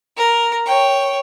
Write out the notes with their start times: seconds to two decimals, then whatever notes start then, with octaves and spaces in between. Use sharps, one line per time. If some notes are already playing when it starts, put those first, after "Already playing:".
0.17 A#4
0.66 C#5 G5